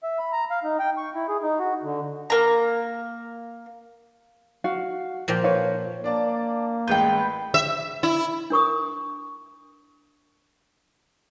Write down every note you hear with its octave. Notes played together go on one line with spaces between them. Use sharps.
E5
B5
A#5
F5
D#4
G5
C#6
E4
G#4
D#4
F#4
D3
A#3 A#5
F#4 F5
A#2 F3 G5
B4 C#5 F5
A#3 D4 D5 A5
A1 G#3 B4 G5 G6
E5
E4
D4 A#4 C#6 D#6